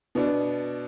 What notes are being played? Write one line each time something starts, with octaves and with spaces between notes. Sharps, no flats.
B2 B3 D4